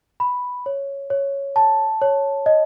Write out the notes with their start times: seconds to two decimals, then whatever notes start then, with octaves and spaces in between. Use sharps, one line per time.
0.20 B5
0.66 C#5
1.10 C#5
1.56 A5
2.02 C#5
2.46 D#5